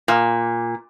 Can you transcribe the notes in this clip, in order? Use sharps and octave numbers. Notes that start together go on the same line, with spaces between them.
A#2